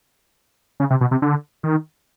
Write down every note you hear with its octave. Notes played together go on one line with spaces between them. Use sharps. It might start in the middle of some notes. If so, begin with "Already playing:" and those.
C#3
C3
B2
C3
D3
D#3